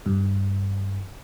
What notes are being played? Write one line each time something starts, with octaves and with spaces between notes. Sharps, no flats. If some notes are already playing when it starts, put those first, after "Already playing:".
G2